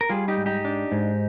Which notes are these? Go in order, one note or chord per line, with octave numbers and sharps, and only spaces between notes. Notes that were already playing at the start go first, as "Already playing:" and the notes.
A#4
G3 F4 G#4
D#4 G4
G#2
D#4 G4
D4
G#2